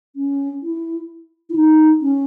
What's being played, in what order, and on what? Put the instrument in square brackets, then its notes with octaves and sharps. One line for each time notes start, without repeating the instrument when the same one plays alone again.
[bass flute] C#4
E4
E4
D#4
C#4